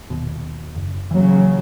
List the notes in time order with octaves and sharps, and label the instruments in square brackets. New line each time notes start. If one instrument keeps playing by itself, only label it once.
[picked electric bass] D#1 D#2 B2
F#1
[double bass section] C#3 F#3 [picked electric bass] E3 A#3